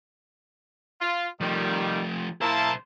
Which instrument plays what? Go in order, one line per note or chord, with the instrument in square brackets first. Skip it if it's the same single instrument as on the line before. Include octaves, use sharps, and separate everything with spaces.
[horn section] F4
[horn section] D#3 G3 [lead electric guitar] F3 A3
[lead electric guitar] B1 C5 [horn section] A#3 E4 A5